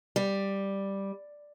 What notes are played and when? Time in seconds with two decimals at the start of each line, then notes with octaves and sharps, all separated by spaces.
0.16 G3